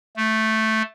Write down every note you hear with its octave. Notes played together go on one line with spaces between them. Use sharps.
A3